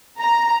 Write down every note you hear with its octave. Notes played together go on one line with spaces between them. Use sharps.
A#5